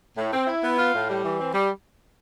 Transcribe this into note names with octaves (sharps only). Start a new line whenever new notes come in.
A2
C4
E4
B3
F4
A2
G3
E3
C4
G3